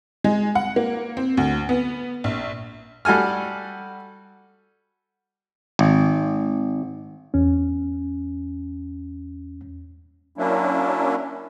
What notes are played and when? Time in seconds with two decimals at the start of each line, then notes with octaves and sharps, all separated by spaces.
0.24 G#3
0.55 F#5
0.76 A#3
1.17 C4
1.37 D2
1.69 B3
2.24 A#1
3.05 G3 F#4 A4 G#5 F6
5.79 G#1
7.34 E2 C#4
10.38 F#3 A#3 C#4 D4 E4